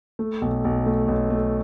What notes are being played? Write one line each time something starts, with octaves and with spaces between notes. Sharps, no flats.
A3
B1
B1
A3
B1
A3